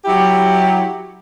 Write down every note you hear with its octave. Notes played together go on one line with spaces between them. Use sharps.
F#3 E4 G4